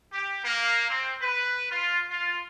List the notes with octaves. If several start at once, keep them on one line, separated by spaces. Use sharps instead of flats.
G4
A#3
C4
B4
F4
F4